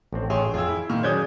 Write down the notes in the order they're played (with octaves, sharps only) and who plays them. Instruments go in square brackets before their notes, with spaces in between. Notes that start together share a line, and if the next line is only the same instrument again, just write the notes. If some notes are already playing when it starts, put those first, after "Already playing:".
[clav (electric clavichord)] A1 C4
[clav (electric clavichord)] A1 G#4 E5 [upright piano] C#5 G5 C6
[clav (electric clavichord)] F2 F4 [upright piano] G#4 G5 E6
[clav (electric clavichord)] E4
[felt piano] A#2 [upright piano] D#3
[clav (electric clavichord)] F#3 [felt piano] C#4 G#4 D5 [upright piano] D#6 G6 G#6